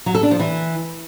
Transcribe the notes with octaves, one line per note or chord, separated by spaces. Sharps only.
F#3
A4
D4
F3
E3